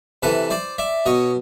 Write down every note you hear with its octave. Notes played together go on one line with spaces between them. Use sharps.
C3 E3 A4 B4
C5 D5
D5 E5
B2 C#5 D#5